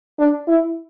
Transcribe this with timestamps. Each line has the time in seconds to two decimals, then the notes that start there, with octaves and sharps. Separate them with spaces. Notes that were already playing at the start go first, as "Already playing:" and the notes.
0.19 D4
0.48 E4